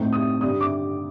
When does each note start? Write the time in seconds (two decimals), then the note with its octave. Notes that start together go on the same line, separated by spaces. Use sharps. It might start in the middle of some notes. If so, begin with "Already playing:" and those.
Already playing: A2 A3 C4 D#4
0.13 D#6
0.41 G2 D3 G3 D#6
0.61 D6